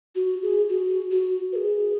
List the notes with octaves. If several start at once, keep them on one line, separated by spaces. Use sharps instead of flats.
F#4
G#4
F#4
F#4
B4
G#4